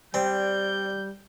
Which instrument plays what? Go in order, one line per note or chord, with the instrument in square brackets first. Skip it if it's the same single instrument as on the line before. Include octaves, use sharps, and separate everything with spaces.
[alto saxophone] G3 [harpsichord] C4 [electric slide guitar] D5 G5 [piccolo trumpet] G6